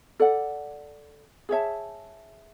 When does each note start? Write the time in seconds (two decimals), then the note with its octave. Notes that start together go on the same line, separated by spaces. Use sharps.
0.20 A4 D5 F#5
1.49 G#4 C#5 E5 A5